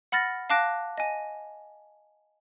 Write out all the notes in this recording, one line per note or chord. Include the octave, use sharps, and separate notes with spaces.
F#5 B5 F6 A6 A#6
F5 A5 D6 F#6 A#6 D7
D#5 G#5